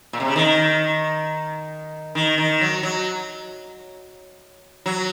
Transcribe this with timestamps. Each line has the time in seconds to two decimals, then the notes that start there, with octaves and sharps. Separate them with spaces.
0.13 A#2
0.20 C3
0.28 C#3
0.36 D#3
2.15 D#3
2.38 D#3
2.61 F#3
2.83 F#3
4.86 F#3